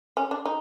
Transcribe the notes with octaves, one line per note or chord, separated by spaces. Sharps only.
C#4
D4
D#4